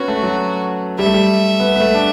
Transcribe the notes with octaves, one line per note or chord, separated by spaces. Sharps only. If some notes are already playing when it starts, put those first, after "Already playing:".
Already playing: B3 C#4 F#4
A3
F#3
G3 E5
A3
G3
B3
B3
A3
D4